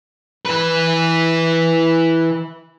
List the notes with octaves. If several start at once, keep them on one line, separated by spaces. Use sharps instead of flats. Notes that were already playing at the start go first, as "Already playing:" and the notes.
E3 B4